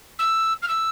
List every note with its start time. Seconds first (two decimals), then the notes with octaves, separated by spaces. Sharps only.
0.19 E6
0.62 F6
0.68 E6